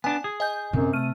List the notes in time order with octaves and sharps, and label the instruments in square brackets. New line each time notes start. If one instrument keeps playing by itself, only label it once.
[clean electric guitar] B3 D4 [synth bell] G#5
[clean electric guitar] G#4
[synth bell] D#5 G#5 G6
[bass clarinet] F#2 [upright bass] C3
[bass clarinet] A3 [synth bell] F6 D#7